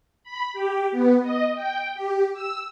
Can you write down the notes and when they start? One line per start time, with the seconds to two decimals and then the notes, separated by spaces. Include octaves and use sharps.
0.24 B5
0.53 G4
0.92 B3
1.23 D#5
1.55 G5
1.95 G4
2.34 E6